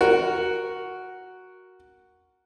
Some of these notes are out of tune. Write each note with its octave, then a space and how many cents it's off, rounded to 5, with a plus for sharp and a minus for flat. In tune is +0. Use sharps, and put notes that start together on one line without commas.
F#4 +0 A#4 +0